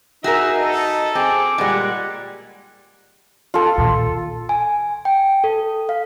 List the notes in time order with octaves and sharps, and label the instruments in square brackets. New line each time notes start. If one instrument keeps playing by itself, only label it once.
[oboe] D#4 [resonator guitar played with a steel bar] F#4 G#4 A#4 [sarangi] E5
[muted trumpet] A4 [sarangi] D#5
[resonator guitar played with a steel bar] C4 [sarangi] G#4 [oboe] D6
[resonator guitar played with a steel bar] A#2 G#3 [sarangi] G3 [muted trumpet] F#5
[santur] F4 A4
[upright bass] A#2 D#3
[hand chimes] G#5
G5
A4
F5